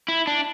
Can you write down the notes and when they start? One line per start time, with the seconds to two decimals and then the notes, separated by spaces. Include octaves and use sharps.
0.08 E4
0.27 D4